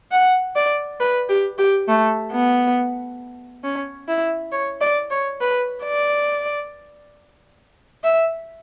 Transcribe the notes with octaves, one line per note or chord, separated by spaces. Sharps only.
F#5
D5
B4
G4
G4
A3
B3
C#4
E4
C#5
D5
C#5
B4
D5
E5